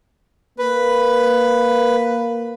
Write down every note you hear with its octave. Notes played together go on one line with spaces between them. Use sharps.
A#3 B4